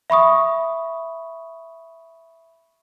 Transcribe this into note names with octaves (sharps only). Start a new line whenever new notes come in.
E5 B5 C#6 D#6